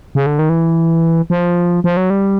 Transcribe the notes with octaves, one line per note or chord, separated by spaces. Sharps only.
C#3
D3
D#3
E3
F3
F3
F#3
G3